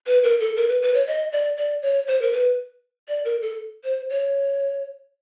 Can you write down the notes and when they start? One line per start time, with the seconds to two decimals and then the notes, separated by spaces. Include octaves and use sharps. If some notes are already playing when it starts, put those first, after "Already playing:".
0.07 B4
0.23 A#4
0.40 A4
0.57 A#4
0.69 B4
0.82 B4
0.94 C#5
1.07 D#5
1.32 D5
1.57 D5
1.82 C#5
2.07 C5
2.22 A#4
2.33 B4
3.08 D5
3.25 A#4
3.42 A4
3.84 C5
4.10 C#5